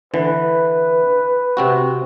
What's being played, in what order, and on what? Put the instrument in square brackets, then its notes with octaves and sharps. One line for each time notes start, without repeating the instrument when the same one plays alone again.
[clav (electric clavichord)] D3 E3 [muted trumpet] B4
[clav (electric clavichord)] C3 C4 F#4